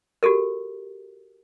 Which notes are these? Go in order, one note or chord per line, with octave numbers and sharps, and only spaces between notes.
F#4 G4 A4 A#4